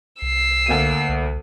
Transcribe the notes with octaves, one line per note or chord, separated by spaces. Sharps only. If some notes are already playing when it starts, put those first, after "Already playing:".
C2 E6 C7
D2 A#3 D#7
C2